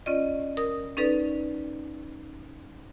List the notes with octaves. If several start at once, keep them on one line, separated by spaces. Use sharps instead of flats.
C#4 F4 D5 D#5
A#4 D#6
C#4 D#4 A4 B4 D5